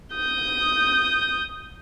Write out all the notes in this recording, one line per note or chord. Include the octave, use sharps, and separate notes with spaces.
D#6 G6